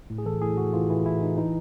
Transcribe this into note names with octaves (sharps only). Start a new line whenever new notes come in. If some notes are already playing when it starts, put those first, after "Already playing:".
A2
G#4
E3 A4
A2 G#4
A2 F#4
E3 F4
E3 E4
A2 E4
E3 D#4
E3 D#4